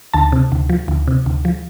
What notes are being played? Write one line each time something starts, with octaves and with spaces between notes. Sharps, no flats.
D2 A5
C3
D2
F3
D2
C3
D2
F3